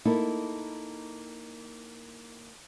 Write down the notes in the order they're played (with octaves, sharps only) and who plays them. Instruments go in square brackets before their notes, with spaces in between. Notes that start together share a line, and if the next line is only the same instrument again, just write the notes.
[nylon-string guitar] A#3 D#4 E4 A4